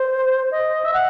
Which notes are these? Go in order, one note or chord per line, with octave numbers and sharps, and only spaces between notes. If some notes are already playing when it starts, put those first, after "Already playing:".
Already playing: C5
D#5
E5
F#5